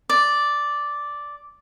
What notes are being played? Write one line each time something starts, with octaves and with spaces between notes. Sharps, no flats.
D5